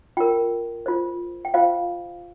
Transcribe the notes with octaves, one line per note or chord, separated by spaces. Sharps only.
F4 A#4 G5
F4 C5
G5
F4 C5 F5